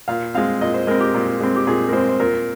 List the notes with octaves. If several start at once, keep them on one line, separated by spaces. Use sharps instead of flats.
A#2 F5
G#3 C4 F5
A#2 D#5
C5
G#3 C4 A#4
G4
A#2
G#3 C4
G4
A#2 G#4
A#4
G#3 C4 C5
C5
A#2 A#4